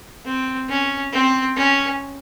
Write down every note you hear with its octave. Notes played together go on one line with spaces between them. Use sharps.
C4
C#4
C4
C#4